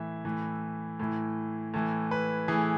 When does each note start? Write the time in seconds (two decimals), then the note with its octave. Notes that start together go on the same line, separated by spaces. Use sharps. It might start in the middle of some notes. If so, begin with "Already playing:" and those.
Already playing: A2 E3 E5
0.25 A2 E3
0.99 A2 E3
1.74 A2 E3
2.11 B4
2.48 A2 E3 G#4